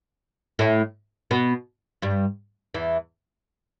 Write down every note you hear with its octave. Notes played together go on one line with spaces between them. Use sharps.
A2 A3
B2 B3
G2 G3
E2 E3